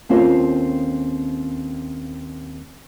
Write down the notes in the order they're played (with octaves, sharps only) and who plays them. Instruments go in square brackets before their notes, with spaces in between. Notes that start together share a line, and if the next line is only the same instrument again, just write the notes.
[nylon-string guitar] D#2 C4 C#4 F4 A4 A#4